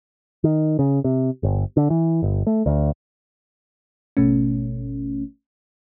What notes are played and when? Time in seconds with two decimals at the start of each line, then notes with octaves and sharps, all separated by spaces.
0.44 D#3
0.79 C#3
1.04 C3
1.43 G1
1.77 D3
1.90 E3
2.22 G1
2.47 A3
2.66 D2
4.17 G#1 B2 A3 C#4